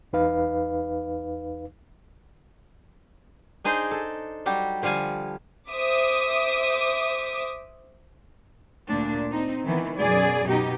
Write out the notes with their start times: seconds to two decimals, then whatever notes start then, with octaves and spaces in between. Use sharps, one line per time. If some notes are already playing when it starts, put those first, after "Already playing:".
0.13 E2 D#4 B4 F5
3.64 D4 D#4 G#4 C5 D5
3.91 A4
4.46 F#3 G3 G4
4.82 D3 F3 G3 F5 G#5
5.69 C5 E5 D6 D#6
8.89 D2 A#2 D4
9.31 C4 D#4
9.64 D#3 E3 B3
9.97 F#2 B2 G#4 D5
10.48 B2 D#4 G4